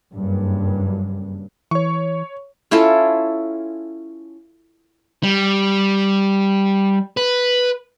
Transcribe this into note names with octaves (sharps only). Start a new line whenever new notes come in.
F#1 G2
E3 C#5 C#6
C#4 E4 F4 A4
G3
B4